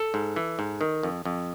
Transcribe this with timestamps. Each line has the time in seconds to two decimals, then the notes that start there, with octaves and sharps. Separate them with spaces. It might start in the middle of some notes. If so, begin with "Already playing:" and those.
Already playing: A4
0.14 G#2
0.36 E3
0.59 G#2
0.81 D#3
1.03 F2
1.25 F2